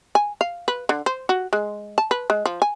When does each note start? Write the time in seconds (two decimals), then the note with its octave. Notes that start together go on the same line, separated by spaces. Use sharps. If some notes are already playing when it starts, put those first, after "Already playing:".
0.15 G#5
0.41 F5
0.68 B4
0.89 D3
1.06 C5
1.29 F#4
1.53 G#3
1.98 A5
2.11 B4
2.30 G#3
2.46 F3
2.62 G#5